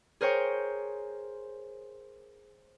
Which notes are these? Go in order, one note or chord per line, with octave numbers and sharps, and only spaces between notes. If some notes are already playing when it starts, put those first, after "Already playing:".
G#4 A#4 C5 C#5 G5